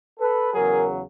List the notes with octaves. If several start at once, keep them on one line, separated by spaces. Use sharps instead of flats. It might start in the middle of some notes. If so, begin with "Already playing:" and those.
A4 B4
E2 C#3 F#3 G#4 A#4